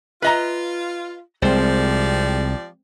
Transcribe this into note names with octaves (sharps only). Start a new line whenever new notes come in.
F4 B4 D#5 A#5
C2 F3 G#3 C4 G4 C5 D5 G5